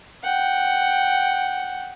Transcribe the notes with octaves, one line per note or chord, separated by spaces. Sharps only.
F#5 G5